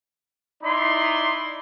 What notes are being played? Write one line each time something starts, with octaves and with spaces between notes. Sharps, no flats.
D#4 E4 D5 B5 C6